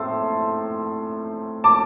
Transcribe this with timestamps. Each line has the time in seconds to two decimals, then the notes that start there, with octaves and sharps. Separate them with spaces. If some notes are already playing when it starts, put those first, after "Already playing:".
Already playing: A2 A3 C4 A5 C6 E6
1.64 A5 D6